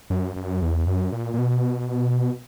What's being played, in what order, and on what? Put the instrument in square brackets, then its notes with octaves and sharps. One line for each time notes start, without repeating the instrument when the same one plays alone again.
[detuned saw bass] F#2
F#2
E2
F#2
A#2
A#2
B2